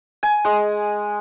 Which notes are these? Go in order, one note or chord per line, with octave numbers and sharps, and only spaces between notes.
G#5
G#3 D#6